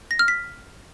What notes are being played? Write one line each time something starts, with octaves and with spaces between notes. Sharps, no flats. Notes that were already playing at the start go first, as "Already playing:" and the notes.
A#6
F6
B6